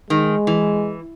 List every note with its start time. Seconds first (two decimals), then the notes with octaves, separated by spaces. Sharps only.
0.10 D#3 G#3
0.47 E3